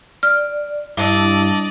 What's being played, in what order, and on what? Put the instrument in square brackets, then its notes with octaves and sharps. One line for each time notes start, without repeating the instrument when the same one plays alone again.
[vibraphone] D5 [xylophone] F6
[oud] G2 [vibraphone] E4 A5 E6 [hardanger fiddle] D5 D#5